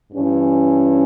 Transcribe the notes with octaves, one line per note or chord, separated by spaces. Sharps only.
G2 E3 C#4